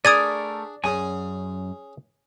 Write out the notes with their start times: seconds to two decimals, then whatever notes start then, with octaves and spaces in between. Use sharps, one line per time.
0.05 A3 D4 G#4 A#4 D5 D#6 G#6 D#7
0.84 F#2 C#4 G#4 C#5 G#5